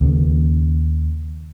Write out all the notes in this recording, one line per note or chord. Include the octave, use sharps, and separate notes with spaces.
D#2 C#3